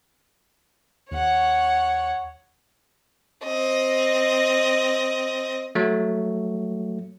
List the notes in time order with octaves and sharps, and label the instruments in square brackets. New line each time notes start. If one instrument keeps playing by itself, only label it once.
[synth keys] D#2 [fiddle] C#5 F#5
[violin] C4 D#5
[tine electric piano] F#3 A3